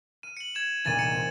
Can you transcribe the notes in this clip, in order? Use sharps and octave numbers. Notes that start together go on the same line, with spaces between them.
F6 D#7
C#7 F#7
G#6 E7
E1 B1 A#2 G#6 A6 D#7
C#7 D#7 E7
C4